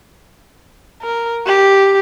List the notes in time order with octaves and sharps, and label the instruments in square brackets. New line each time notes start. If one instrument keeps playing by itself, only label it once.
[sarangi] A#4
G4